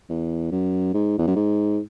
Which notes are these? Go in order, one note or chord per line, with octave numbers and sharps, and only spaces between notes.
E2
F#2
G#2
E2
F#2
G#2